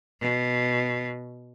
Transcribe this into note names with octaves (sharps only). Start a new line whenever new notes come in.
B2